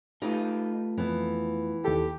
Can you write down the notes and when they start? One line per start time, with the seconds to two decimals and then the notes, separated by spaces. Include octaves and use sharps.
0.22 A3 D#4 F4 G4 B4
0.98 F2 E3 B3
1.85 D#2 G4 A4